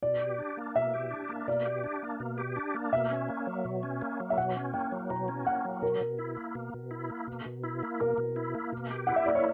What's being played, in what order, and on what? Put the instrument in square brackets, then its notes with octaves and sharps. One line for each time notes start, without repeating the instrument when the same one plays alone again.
[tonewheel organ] B2 [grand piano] D5
[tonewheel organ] G4
D4
A#3
[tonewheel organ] B2 [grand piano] E5
[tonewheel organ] G4
D4
A#3
[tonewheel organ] B2 [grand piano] D5
[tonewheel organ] G4
D4
A#3
B2
G4
D4
A#3
[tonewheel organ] B2 [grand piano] E5
[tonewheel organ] C#4
A#3
F#3
B2
C#4
A#3
F#3
[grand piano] E5
[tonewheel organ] B2 [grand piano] F#5
[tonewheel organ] C#4
[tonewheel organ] A#3 [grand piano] G5
[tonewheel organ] F#3
[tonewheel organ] B2 [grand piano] A#5
[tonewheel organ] C#4
[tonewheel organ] A#3 [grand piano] F#5
[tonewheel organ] F#3
[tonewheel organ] B2 [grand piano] A#4
[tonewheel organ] B2
E4
A#3
B2
B2
E4
A#3
B2
B2
E4
A#3
[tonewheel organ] B2 [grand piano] A#4
[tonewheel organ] B2
E4
A#3
B2
G4
[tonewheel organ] E4 [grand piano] F#5
[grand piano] E5
[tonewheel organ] A#3 [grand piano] D5
[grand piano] C#5